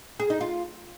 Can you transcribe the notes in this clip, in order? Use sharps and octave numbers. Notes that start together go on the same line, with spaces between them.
G#4
D#4
F4